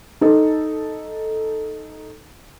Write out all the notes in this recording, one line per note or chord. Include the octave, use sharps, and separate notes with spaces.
D#4 A4